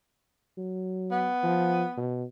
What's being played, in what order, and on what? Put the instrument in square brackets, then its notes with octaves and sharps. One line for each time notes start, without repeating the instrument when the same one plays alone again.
[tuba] F#3
[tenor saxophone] B3
[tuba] F3
B2